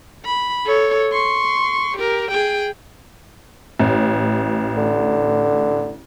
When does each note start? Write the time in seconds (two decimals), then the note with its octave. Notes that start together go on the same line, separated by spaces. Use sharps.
0.25 B5
0.65 A4 C#5
1.13 C6 C#6
1.97 G4 A#4
2.31 G#4 G5
3.80 A1
4.77 D3